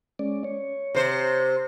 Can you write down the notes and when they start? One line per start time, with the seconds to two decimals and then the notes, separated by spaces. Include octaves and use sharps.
0.19 G#3 C#4 D5
0.44 C#5
0.95 C3 C5